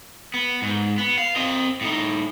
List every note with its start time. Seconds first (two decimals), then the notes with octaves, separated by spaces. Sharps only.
0.34 B3
0.62 G#2
0.98 B3
1.18 F5
1.36 C4 D#5
1.81 A2 D#4